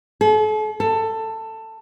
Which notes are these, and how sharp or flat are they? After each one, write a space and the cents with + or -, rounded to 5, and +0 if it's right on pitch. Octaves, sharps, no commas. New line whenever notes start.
A4 -45
A4 +15